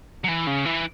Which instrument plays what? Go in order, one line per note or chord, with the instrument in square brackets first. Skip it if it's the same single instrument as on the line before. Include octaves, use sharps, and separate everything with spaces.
[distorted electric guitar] F#3
E3
C#3
E3